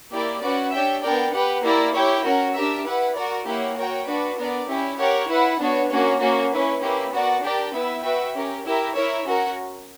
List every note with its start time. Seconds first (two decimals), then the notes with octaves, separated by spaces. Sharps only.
0.11 A#3 E4 G4 A#4 D5
0.42 C#4 F#4 B4 D5 F#5
0.71 D4 G4 C#5 E5 G5
1.02 B3 D4 A#4 D5 G5
1.33 G4 B4 F#5
1.63 A#3 E4 G4 A#4 D5
1.94 E4 G4 C#5 G5
2.24 C#4 F#4 A#4
2.54 D4 G4 A#4 E5
2.85 E4 B4 F#5
3.16 F#4 A#4 D5
3.46 A#3 E4 G4 C#5 F#5
3.77 F#4 A#4 C#5 G5
4.06 D4 F#4 B4 D5
4.37 B3 D4 A#4 D5
4.68 C#4 E4 G4
4.98 G4 A#4 C#5 F#5
5.28 E4 B4 F#5
5.59 B3 D4 F#4 C#5
5.89 A#3 C#4 F#4 C#5
6.20 A#3 C#4 F#4
6.51 C#4 E4 B4
6.81 A#3 C#4 E4 G4 B4
7.12 B3 F#4 A#4 D5 F#5
7.42 D4 G4 A#4 D5 G5
7.73 B3 E4 B4 E5
8.03 F#4 B4 E5 G5
8.33 C#4 G4 A#4
8.64 E4 G4 A#4 E5
8.94 E4 A#4 C#5 E5
9.24 C#4 F#4 A#4